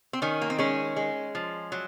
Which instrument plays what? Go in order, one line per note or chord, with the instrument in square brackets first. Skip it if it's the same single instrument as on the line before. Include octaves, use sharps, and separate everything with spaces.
[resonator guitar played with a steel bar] C4
D#3 C#4
A#3
C4
G#3 C#4
G#3
F3
F#3